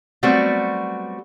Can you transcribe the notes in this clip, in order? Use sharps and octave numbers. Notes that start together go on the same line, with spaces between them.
F#3 G3 A3 B3 C4 F#4